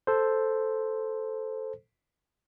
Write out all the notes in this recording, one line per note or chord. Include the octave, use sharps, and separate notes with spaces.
A4 C5